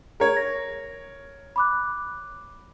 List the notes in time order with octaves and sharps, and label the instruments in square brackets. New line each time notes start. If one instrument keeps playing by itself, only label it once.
[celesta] G#4 A#5 G#6 [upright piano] A#4 C#5
[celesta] A#6
B5 D6 F#6